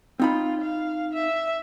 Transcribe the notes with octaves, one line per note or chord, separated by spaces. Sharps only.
C4 D#4 F4 B5
F5
E5